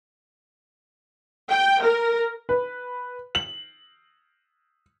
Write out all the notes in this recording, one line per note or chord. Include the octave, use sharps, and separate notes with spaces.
G5
A#4
B4
F#7